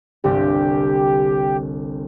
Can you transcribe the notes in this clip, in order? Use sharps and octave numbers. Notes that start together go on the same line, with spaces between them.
G1 C2 G3 G4